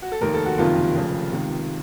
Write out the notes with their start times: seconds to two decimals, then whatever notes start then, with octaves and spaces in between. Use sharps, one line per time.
0.02 F#4
0.12 A4
0.21 F1 D#2 D#3 A#4
0.34 A4
0.45 F#4
0.58 F#1 F2 C3 D#3 F4
0.95 F1 F2 C#3
1.31 C#2 C3 D#3